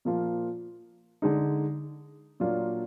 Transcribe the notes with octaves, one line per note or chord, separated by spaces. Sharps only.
A#2 F3 A#3 F4
D3 G#3 D#4
A#2 F#3 A#3 D4 F4